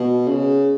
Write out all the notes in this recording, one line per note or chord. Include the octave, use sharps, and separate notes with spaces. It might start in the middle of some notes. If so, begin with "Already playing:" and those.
Already playing: B2
C#3